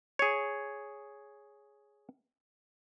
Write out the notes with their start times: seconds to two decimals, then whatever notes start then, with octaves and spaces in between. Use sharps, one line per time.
0.19 G#4 C#5